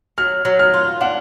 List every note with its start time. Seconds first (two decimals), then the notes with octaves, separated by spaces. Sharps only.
0.18 F#3 F6
0.45 F#3
0.59 F6
0.74 F4
1.01 D4 F#5